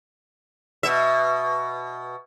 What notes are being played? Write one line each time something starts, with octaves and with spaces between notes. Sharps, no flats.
B2 E5